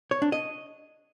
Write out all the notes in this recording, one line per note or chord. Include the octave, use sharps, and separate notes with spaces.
C#5
D4
D#5